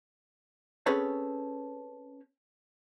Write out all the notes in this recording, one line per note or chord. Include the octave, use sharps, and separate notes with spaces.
C4 C#4 G#4 A4 B4 C#5